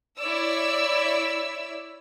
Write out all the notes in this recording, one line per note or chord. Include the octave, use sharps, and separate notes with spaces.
E4 C#5 D5 E6